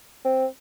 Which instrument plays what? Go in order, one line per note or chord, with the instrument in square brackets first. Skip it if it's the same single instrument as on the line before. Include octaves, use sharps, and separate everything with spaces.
[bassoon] C4